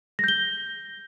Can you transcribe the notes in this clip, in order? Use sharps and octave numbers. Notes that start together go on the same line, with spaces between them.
G6 A#6 G7